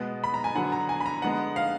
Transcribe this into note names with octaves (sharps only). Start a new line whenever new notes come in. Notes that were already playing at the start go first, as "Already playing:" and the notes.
Already playing: B2 G#3 B3
B5
A#5
G#5
D3 F#3 B3 F#5
A#5
G#5
B5
A#5
D3 G#3 B3 F#5
F5